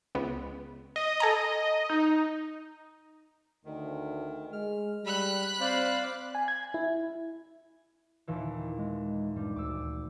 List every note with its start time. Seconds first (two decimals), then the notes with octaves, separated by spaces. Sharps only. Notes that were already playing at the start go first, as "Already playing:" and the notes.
0.15 C#2 B3
0.96 D#5
1.20 A4 G#5 A#5
1.90 D#4
3.65 D2 D#3
4.53 G#3 F6
5.05 G3 B5 F#6
5.60 C4 C5 D5 F5
6.35 G#5
6.48 G#6
6.74 E4
8.27 D#2 A#2 E3
8.79 G#3
9.36 G2 G3
9.56 D2 D6 E6